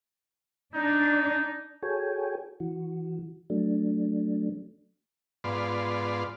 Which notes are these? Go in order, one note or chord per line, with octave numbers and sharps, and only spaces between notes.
D4 D#4
F#4 G#4 A4 C#5 G5 G#5
E3 F#4
F#3 A3 D4
G#2 B3 F4 D5 C6